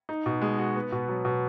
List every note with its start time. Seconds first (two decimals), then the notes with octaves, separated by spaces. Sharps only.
0.09 D#4
0.26 B2
0.42 G#3
0.58 F#4
0.76 B3
0.92 B2
1.09 F#3
1.25 B2